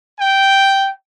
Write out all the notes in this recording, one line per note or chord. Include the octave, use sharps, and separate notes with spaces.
G5